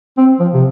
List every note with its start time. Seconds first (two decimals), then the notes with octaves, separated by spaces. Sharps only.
0.18 C4
0.40 F3
0.54 C3